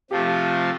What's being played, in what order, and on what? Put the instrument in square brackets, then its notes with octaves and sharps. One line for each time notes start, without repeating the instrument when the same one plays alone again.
[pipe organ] C3 F3 A3 F4 [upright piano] G4